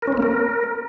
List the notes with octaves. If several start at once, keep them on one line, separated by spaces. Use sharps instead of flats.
A#4
C#4
C4
A#3
A#4